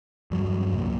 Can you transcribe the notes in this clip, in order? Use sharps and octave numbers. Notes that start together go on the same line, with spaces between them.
E2 G2 F#3
C2 A#2